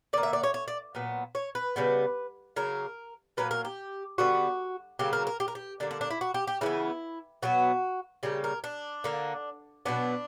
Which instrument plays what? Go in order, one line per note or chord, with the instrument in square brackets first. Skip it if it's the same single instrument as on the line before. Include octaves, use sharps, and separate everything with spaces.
[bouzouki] D3 D5
A#3
E5
D5
C#5
C#5
D5
A#2 F#3 B3
C#5
B4
C#3 G3 B3
C#3 F#3 A#3 A#4
A#2 F#3 A#3 B4
A#4
G4
D3 G3 B3 F#4
C#3 F#3 A#3 G4
A#4
A#4
G4
A#4
G4
D3 G3 A#3 D4
D4
D4
E4
F#4
G4
G4
C#3 E3 B3 E4
B2 F#3 B3 F#4
C#3 G3 A#3 G4
A#4
D4
D3 A#3
B2 F#3 B3 D4